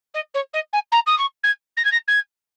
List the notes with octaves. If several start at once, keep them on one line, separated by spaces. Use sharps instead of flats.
D#5
C#5
D#5
G#5
A#5
D#6
C#6
G#6
A#6
G#6
A#6
G#6